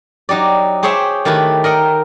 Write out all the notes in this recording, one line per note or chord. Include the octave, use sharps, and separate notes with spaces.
F#3 D#4 G4 D5
G4 G#4 C5 C#5 E5 G5
D#3 A3 E4 G4 B4
A#4 D#5 F#5 G5